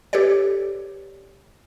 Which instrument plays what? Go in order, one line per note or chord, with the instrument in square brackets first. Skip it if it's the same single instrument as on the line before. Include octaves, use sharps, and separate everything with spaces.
[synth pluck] G4 A4 B4 C#5 D5